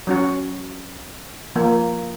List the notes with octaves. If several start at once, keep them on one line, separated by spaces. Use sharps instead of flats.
F#3 C#4 F#4
F3 A#3